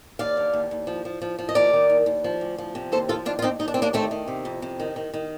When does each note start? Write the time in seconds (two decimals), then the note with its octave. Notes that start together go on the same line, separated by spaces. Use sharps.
0.19 D#2 D5 F5
0.37 D3
0.53 D#2
0.71 D#2
0.87 F3
1.05 F3
1.22 F3
1.39 F3
1.49 D#5
1.55 D#2 A#4 D5
1.73 D#3
1.90 D#2
2.06 D#2
2.24 F3
2.41 D2
2.58 F3
2.75 C3
2.92 D#2 A4 C5
3.09 F3 F4 A4
3.25 D#2 D4 F4
3.39 F4
3.42 D#2 C4 D#4
3.59 D#2 D#4
3.68 D4
3.74 D#2 C4
3.82 A#3 D4
3.93 D#3 A3 C4
4.11 D#3
4.28 C3
4.45 F2
4.62 C3
4.80 D#3
4.96 D#3
5.13 D#3